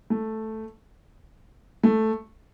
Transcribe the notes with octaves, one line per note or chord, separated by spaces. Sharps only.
A3
A3